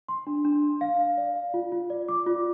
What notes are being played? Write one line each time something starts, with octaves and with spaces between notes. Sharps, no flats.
C6
D4
D4
D4
F5
F5
D5
F5
F4
F4
D5
D6
F4